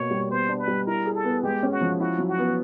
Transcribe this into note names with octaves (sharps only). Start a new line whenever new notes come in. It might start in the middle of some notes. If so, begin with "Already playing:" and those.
Already playing: B2 A#3 C#5
G3
B3 C5
D4
B4
G3
E4 A#4
G#4
A4
B3
G#3 G4
C#4
F#4
F3
E4 F#4
F#3
F#4
B3